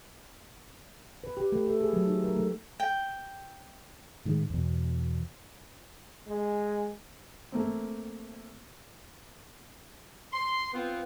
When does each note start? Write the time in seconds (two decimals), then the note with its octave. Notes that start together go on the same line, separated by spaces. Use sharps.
1.24 B4
1.37 G4
1.52 A3
1.66 A4
1.80 G#4
1.93 F#3
2.07 D#4
2.24 A#4
2.36 A3
2.80 G5
4.25 A2 D#3 G#3
4.50 E2 B2
6.27 G#3
7.52 A3 A#3 C4
10.33 C6
10.73 B3 C4 F4